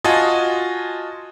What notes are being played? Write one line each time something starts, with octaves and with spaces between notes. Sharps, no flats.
F4 F#4 D#5 G#5 A5 D#6